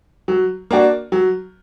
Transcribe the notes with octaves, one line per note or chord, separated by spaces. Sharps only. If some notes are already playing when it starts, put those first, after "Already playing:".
F#3
A#3 D4 F#4
F#3